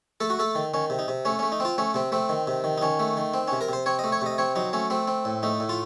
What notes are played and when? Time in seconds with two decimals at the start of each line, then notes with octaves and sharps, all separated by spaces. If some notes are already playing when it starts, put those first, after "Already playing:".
0.20 A3 A4
0.30 F#4
0.39 A3 A4
0.55 D#3
0.74 D#3 C#4
0.90 C3
0.99 D#4
1.08 C3
1.25 A3 C#4
1.39 A3 C#4
1.52 D#4
1.60 C4 F4
1.78 A3 C#4
1.94 C3 C4
2.12 A3 C4
2.29 D#3
2.47 C3
2.64 D#3
2.78 D#4
2.81 D#3 C#4
3.00 A3
3.17 D#3
3.34 C4
3.48 C#4
3.52 C3
3.61 A#4
3.69 C3 C5
3.86 C4 C#5
3.99 D#5
4.04 A3
4.12 C#5
4.22 C3 D#5
4.38 C4 C#5
4.56 F#3 D#4
4.73 A3 C#4
4.90 A3 C4
5.07 C4
5.25 A2
5.43 A3 D#4
5.60 A2
5.69 F4